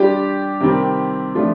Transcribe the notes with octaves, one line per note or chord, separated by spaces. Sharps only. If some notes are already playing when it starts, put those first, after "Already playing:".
Already playing: G3 D4 F4 G4
C3 D#3 G3 C4
F3 A3 D4 F4